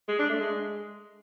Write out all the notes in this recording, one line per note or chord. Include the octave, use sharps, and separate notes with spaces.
G#3
D4
A3
G#3